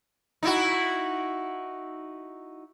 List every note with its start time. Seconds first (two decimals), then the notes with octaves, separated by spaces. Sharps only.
0.43 D#4 E4 F#4